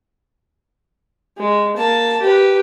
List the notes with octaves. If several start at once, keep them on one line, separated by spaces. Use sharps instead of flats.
G#3
A#3 A5
G4 B4